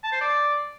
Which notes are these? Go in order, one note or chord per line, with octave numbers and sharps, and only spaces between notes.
A5
C5
D5